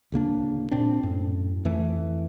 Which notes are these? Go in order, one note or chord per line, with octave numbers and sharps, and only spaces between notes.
D1 C#3 A#3 D4
A#2 C4 D4
F#2 A2
F2 E3 A3